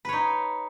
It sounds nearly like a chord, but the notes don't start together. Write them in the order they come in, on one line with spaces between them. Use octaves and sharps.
B4 C#5 D#4